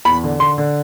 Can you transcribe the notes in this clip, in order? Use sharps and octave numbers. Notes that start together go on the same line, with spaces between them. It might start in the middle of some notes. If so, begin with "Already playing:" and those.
E2 B5
D3
D3 C6
D3